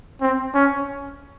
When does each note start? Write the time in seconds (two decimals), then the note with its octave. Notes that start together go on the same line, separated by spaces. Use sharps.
0.22 C4
0.55 C#4